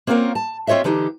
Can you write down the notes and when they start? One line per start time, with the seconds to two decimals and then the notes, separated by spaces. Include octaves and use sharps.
0.07 A#3 C4 C#4 F4 A#4 F#5
0.35 A5
0.67 C4 F4 C#5 D#5 E5
0.84 D3 E3 D#4 G4